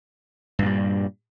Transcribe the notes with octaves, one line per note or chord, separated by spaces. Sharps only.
G2 A#2 G3